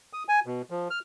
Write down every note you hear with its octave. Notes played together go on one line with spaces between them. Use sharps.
D#6
G#5
B2
F3
F6